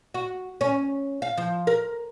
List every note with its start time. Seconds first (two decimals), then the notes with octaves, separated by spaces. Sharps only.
0.14 F#4
0.61 C#4
1.22 F5
1.38 F3
1.67 A#4